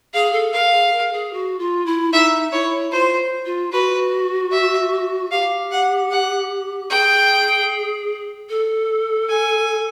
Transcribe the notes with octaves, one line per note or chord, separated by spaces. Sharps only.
G#4 F5
A4
A#4 F5
G#4
A#4
G#4
F#4
F4
E4
D#4 E5
E4 C#5
F4 C5
F4
F#4 B4
E5
G4 F5
F#5
F#5
G#4 G5
A4
G#5